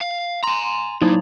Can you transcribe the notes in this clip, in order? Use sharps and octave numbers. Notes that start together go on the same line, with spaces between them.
F5
G#5 A#5 C6
A2 F#3 A#3 D#4 E4